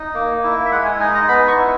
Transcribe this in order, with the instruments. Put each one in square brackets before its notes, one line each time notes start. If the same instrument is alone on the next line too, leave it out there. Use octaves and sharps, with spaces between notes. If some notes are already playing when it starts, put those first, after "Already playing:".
Already playing: [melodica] D#4
A#3
E4
E5
G#3 F#5
G#5
D#4 G#5
A#5
B3 B5
C#6
E4